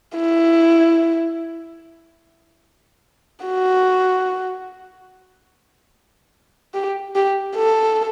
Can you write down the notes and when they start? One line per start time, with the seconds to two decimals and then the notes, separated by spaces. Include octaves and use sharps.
0.15 E4
3.45 F#4
6.74 G4
7.15 G4
7.56 A4